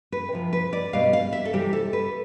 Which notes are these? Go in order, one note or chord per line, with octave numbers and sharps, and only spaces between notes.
B4
C3 F3
B4
D5
B2 G3 F5
F5
E5
A4
C3 E3 G3 G4
A4
B4